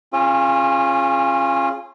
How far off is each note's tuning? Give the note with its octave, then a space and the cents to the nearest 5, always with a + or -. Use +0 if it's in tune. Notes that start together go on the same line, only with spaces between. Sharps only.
C#4 -30 F4 -10 G#4 +0